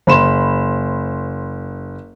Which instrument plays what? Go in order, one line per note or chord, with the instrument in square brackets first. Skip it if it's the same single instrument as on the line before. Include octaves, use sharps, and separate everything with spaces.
[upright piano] F#1 B5 E7 [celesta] C5 C6